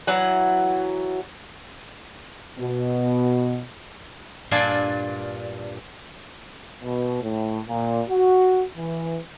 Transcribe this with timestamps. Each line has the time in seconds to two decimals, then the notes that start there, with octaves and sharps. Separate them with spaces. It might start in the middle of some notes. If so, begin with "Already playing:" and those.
0.07 E3 F#3 F#5
2.59 B2
4.51 G2 A#2 D4 F4 D5 G#5
6.83 B2
7.22 A2
7.68 A#2
8.09 F#4
8.77 E3